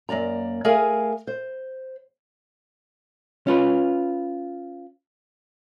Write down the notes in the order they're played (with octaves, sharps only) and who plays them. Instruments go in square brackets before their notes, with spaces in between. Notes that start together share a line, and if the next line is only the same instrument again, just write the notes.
[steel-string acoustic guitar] F#2 A#3 D5 A#5
A3 G#4 A#4 F5 G#5
C5
[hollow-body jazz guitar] C#4 F4 B4